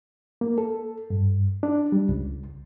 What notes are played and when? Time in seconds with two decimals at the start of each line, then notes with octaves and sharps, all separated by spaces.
0.41 A#3
0.58 A4
1.10 G2
1.63 D4
1.92 G3
2.09 C#2